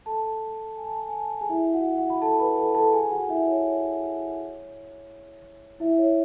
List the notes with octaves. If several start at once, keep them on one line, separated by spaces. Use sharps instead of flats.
A4 A5
G#5
A5
G#5
A5
G#5
A5
G#5
A5
G#4 G#5
E4 E5
F#4 F#5
F#4 F#5
B5
A4 A5
B4 B5
A4 A5
A4 A5
G#4 G#5
F#4 F#5
E4 E5
C#5
C#5
E4 E5
C#5